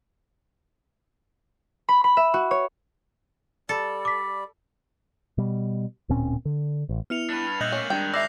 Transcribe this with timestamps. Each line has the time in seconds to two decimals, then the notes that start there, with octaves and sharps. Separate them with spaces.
1.89 B5
2.04 B5
2.17 E5
2.34 F#4
2.51 C#5
3.69 G3 A4 D5
4.05 D6 B6
5.38 B2 G3
6.09 D1 A#2 C4 C#4
6.45 D3
6.89 A1
7.10 B3 E4 F6 C#7 F7
7.30 D4 B4
7.61 G2 A#2 D#5 E5 F#6 G6 A#6 F#7
7.72 A3 A#3 C#4
7.90 G#2 D#3 G3 D4 G5
8.14 D5 E5 E6 A#6 C7 F7